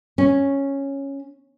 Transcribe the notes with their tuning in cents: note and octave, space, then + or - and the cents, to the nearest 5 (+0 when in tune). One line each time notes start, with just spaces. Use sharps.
C#4 -5